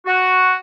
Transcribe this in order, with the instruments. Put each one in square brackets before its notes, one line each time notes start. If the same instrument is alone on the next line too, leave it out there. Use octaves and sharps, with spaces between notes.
[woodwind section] F#4